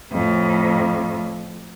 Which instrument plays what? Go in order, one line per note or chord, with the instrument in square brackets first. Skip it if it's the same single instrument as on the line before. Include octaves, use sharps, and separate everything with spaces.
[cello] F2 A2